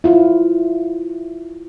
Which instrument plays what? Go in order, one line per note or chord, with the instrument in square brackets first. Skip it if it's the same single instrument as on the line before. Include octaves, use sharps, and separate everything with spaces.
[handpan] E4 F4